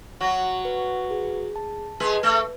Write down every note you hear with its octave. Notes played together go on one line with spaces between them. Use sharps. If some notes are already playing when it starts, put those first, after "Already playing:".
F#3 F#4 F#5
B4
G#4
A5
G#3 G#4 B4
A3 A4